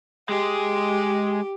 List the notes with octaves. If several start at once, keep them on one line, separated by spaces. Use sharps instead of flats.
G#3 G4 G#4